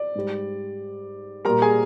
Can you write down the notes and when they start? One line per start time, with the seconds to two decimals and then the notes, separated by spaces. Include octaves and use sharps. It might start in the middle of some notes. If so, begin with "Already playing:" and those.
Already playing: D5
0.15 G#2 G3
1.45 A#2 G3 A#4 A#5
1.62 G#4 G#5